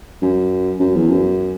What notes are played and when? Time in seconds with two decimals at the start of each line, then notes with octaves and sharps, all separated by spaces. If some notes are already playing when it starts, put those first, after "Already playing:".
0.22 F#2
0.79 F#2
0.95 E2
1.09 F#2